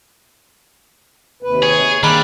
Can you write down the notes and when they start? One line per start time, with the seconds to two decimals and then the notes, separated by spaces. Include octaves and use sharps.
1.43 D#2 C3 B4
1.63 G#4 C#5
2.03 D#3 G3 A#3 D4 G#4 B5